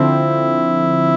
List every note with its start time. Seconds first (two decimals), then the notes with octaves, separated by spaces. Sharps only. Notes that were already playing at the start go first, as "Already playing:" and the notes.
Already playing: D3 F3 C4 E4